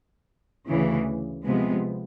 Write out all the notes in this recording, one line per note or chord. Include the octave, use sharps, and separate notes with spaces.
D2 C#3 E3
C3 F3 G#3 B3